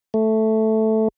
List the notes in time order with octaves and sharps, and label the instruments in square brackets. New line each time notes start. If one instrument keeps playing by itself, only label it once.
[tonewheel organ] A3